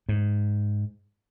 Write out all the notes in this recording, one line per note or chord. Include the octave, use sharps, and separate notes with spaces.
G#2